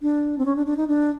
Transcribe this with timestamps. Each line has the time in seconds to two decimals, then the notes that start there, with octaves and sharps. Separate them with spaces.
0.02 D4
0.38 C4
0.45 C#4
0.56 D4
0.66 D4
0.77 D#4
0.88 D4